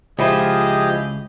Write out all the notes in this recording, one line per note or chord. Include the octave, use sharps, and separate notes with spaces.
C#2 F3 E4 G4 G#4 D#5